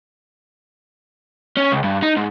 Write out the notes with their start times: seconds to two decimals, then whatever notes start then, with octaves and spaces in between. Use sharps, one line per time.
1.57 C#4
1.72 C#2
1.84 G2
2.03 D#4
2.17 G#2